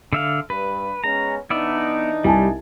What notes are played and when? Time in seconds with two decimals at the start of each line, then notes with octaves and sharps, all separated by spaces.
0.13 D3 E5 F5
0.50 G2 B4
1.04 G#3 B3 C#4 A#5
1.50 E3 B3 D4 D#4 D5 E5
2.24 C2 G3 G#5 A5